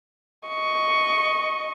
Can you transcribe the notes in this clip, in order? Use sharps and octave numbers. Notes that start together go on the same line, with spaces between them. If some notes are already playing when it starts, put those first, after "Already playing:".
D#5 C#6